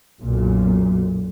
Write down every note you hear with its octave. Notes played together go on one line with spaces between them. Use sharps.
B1 F#2 A#2